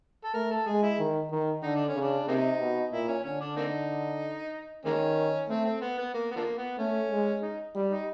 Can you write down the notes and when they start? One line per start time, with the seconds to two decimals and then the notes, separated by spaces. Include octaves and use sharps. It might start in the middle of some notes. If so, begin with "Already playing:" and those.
0.24 A4
0.34 A3 A#4
0.51 A4
0.66 G#3 G#4
0.83 E4
0.99 D#3
1.31 D#3
1.63 D3 D#4
1.75 D4
1.88 C#4
1.95 C#3
2.01 D4
2.27 C3 A#3 C4 D#4
2.60 B2
2.92 A#2 E4
3.08 C#4
3.24 D3 C#4
3.40 D4
3.56 A#3 C4 D#4
4.85 D#3 G#3 A#3 C#4
5.50 A3 C4
5.66 C4
5.82 B3
5.98 B3
6.14 A#3
6.31 B3
6.36 D3 F3 A#3
6.57 B3
6.78 A3 C#4
7.11 G#3
7.43 D#4
7.75 G3
7.91 D#4